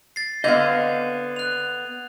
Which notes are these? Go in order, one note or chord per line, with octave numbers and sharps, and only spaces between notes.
A6 C7
D3 B3 C4 D#5 F5 G6 G#6
F#6 F7